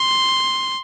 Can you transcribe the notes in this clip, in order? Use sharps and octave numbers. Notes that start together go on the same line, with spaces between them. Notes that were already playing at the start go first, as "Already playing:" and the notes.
Already playing: C6